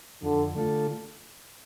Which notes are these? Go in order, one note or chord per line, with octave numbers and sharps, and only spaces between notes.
F2 D3
D3 A3 F4 A4